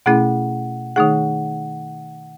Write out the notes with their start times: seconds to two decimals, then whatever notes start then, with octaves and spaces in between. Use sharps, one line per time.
0.06 B2 A3 C#4 E4 G#4 F#5
0.96 D#3 A3 D#4 G#4 F#5